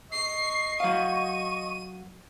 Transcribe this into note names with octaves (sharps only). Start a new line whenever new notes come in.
D#5 C#6 C7
F#3 F5 D#7